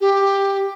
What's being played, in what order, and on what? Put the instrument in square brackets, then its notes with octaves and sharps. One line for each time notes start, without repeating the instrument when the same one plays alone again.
[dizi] G4